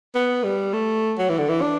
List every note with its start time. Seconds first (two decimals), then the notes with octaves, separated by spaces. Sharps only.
0.15 B3
0.44 G3
0.74 A3
1.18 F#3
1.29 E3
1.38 D3
1.49 E3
1.62 D4